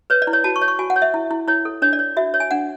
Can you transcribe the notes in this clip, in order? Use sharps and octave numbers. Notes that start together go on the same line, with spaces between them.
B4 C#5
D5
E4
C#5
F#4 A5
C#6
C#5
C#6
F#4 G#5
F#5
C#5
E5
E4
E4
E4 C#5
A4
D4 C#5
D5
C#5
F#4 E5
C#5
G#5
D4 F#5